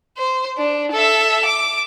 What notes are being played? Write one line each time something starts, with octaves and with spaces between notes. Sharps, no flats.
C5
D4
A4 E5
D6